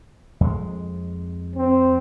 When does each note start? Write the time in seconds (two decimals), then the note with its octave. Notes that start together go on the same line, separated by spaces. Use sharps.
0.41 F2 G#3
1.56 C4